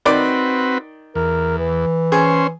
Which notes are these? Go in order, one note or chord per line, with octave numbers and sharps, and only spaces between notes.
D#3 C4 F#4 B4 D5 D6
E2 A#4
E3
C#4 G#4 C5